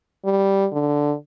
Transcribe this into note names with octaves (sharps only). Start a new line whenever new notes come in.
G3
D3